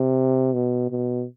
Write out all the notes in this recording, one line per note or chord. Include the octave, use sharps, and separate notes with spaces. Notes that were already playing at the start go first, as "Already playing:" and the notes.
Already playing: C3
B2
B2